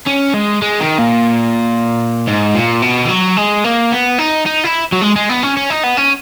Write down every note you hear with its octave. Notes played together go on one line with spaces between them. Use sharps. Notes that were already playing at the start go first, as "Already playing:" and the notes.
C#4
G#3
G#3
D#3
A#2
G#2
A#2
B2
E3
F#3
G#3
A#3
B3
D#4
D#4
E4
F#3
G#3
G#3
B3
C#4
C#4
D#4
B3
C#4